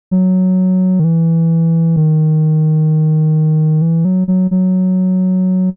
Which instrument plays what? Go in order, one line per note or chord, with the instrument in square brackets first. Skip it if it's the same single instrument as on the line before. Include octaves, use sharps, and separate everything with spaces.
[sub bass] F#3
D#3
E3
D#3
E3
F#3
F#3
F#3